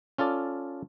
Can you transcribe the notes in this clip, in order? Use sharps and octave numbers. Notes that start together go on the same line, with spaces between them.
C#4 F4 A4 D5